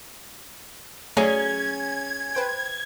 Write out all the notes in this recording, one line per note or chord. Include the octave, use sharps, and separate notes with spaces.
F#3 A3 C#4 G#4 G#5 A#5 G#6
B4 C5 G5